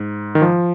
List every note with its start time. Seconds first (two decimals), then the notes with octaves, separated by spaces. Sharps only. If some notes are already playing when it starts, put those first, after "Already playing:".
Already playing: G#2
0.35 D#3
0.42 F3